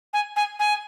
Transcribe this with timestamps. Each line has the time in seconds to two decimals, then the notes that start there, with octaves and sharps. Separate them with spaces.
0.13 G#5
0.36 G#5
0.59 G#5